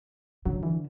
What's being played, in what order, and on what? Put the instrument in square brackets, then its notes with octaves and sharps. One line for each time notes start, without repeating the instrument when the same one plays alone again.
[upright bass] D3 [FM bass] F#3
[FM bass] E3